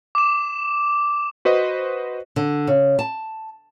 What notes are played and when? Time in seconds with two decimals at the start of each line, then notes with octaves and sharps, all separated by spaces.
0.15 D6 E7
1.45 F#4 B4 C5 D#5
2.36 D3
2.67 C#3
2.99 A5